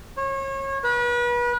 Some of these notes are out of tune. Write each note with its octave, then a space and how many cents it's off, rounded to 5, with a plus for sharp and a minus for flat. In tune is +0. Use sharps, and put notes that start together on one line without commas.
C#5 -30
B4 -35